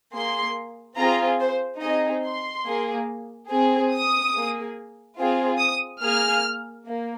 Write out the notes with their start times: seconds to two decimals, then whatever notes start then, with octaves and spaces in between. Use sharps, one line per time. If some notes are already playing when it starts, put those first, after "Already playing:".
0.14 A#3 G#4 C6
0.97 C4 F4 G#4 A#5
1.40 C5
1.81 C4 D#4 G#4 D#5
2.24 C6
2.66 A#3 G#4
3.50 C4 G#4
3.92 D#6
4.33 A#3 G#4
5.18 C4 F4 G#4
5.59 D#6
6.01 A#3 G#4 F6
6.86 A#3